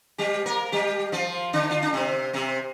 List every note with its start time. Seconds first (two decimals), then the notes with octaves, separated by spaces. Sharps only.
0.18 G3 G4
0.46 A#3 A#4
0.72 G3 G4
1.12 F3 F4
1.53 D3 D4
1.71 F4
1.82 D4
1.93 C3 C4
2.33 C3 C4